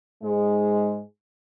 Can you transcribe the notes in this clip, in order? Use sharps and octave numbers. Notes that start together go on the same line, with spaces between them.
G#2 G#3